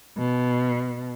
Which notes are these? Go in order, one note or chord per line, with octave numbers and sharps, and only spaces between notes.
B2